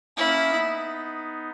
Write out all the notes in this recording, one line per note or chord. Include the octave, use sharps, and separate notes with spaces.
A#3 C#4 E4
B3 D#4